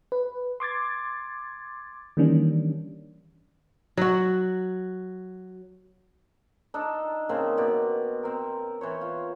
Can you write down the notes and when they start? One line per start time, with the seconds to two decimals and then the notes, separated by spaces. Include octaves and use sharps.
0.12 B4
0.60 C6 D6 G#6 A6
2.17 D#3 E3 G3 A#3 C#4 D4
3.97 F#3 F#4
6.74 D4 D#4 A4
7.29 C#3 A#3 C4
7.57 B2 D5
8.23 C4 A#4
8.81 E3 C5 C#5
9.01 F4